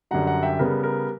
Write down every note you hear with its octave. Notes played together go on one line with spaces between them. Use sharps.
F#2 D3 G3 F#5 A#5
F#5 A#5
E5 G5
C#3 G3 B3 A#4
A#4